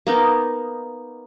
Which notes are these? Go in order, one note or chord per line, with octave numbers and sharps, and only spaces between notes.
A#3 B3 D#4